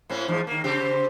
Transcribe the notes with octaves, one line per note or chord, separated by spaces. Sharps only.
A2 C4 C#4
E2 G#2 F3
D#3 A#3
C#3 C4 G4